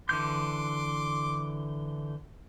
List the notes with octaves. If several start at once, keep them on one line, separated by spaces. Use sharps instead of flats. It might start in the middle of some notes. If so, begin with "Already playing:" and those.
D3 E3 C6 D6 G6